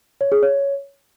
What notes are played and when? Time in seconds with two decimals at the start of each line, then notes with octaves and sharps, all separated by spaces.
0.21 C#5
0.32 G#4
0.43 C#5